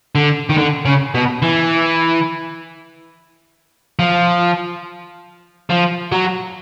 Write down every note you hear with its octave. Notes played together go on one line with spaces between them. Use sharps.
D3
D#3
D3
C#3
B2
E3
F3
F3
F#3